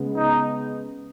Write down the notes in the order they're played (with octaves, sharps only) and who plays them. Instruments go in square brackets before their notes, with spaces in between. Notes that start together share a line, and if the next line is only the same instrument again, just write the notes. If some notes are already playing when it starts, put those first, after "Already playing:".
Already playing: [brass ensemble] C#3 G#3 B3
[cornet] D#4